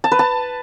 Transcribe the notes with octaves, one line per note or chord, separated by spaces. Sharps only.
A5
B4
A5